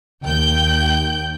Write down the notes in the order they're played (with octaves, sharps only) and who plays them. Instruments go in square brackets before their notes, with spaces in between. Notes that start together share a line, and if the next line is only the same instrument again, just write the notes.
[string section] D#2 G5 G6